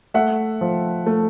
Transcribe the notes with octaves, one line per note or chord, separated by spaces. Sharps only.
A3 E5 F#5
F3
A3